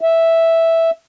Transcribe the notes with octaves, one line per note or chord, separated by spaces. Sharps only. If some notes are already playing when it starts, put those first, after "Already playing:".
E5